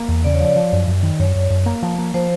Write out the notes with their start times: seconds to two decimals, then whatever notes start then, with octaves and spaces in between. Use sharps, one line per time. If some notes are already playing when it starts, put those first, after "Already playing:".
Already playing: A#3
0.08 E2
0.24 C#3 D5
0.34 C#5
0.40 F3 D5
0.56 F3
0.73 F#2
0.88 F#2
1.03 D#3
1.19 F#2 C#5
1.35 F#2
1.50 F#2
1.66 A#3
1.83 F3
1.98 A#3
2.14 F3 C5